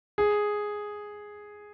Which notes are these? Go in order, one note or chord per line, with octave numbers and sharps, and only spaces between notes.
G#4